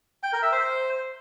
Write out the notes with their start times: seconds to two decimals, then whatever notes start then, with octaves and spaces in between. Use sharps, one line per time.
0.23 G5
0.33 A#4
0.42 E5
0.52 C5